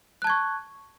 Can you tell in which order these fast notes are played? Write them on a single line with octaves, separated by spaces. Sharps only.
F#6 A5 G#6 C#6